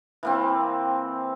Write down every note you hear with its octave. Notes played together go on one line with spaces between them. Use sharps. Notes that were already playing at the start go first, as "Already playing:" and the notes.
E3 A#3 C4